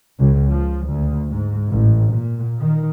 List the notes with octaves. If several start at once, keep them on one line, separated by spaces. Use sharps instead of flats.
C#2
F3
D2
G#2
A1
A#2
D#3